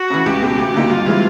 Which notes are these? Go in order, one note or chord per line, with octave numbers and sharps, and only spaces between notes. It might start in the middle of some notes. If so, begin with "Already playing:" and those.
Already playing: F#4
C#3 E3
C#2 G4
B2 G#3
D2
D3 F#3 A#3 D#4
G2 F4
E3 G#3 C4 E4